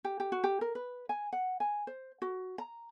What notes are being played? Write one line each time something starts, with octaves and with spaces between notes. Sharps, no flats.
G4
G4
F#4
G4
A#4
B4
G#5
F#5
G#5
C5
F#4
A#5